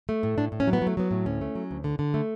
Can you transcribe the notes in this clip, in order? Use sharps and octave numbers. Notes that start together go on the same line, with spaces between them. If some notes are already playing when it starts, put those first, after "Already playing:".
A3
A2
A2 D4
A2
C#4
F#3
B3
F#3
A3
F#3 B3
A2
D2 C#4
A3
F#3
D2
D3
D3
A3